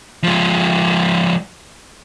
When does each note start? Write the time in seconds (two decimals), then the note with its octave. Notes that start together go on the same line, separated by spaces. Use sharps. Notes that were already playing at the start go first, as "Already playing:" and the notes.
0.24 F3 G#3